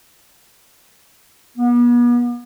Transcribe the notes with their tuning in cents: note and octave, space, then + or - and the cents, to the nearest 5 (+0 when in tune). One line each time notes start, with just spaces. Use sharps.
B3 -40